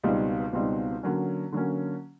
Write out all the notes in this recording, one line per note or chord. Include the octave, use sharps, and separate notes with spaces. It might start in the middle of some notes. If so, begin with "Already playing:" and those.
C#2 B2 G3 C4 D#4
C#2 B2 G3 C4 D#4
D3 F#3 A#3 C#4
D3 F#3 A#3 C#4